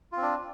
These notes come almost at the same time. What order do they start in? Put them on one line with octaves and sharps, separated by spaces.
F4 C4 D4